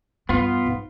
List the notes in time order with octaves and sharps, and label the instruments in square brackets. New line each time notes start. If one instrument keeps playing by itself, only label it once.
[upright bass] E2 G2 [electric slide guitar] B3 F4
[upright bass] G#2 C4